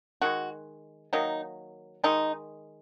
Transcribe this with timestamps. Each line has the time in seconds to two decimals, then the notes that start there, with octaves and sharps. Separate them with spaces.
0.22 D#3 G#3 F#4
1.13 D#3 F#3 A#3 D#4
2.04 D#3 G#3 D#4